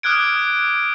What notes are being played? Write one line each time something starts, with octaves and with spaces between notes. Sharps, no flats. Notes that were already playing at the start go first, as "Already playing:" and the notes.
D6 D#6 F6 F#6 G#6 D7